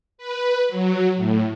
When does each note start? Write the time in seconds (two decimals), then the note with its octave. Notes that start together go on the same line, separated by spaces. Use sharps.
0.18 B4
0.69 F#3
1.16 A2